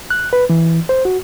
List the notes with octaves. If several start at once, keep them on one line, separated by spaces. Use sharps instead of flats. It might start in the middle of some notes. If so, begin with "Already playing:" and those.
F#6
B4
E3
C5
F#4